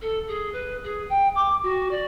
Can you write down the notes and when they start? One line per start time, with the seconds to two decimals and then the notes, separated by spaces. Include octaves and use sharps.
0.01 A4
0.27 G#4
0.53 B4
0.83 G#4
1.09 G5
1.35 D6
1.63 F#4
1.90 D5